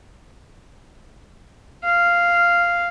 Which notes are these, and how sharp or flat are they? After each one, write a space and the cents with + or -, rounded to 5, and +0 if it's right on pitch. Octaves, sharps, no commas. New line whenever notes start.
F5 -5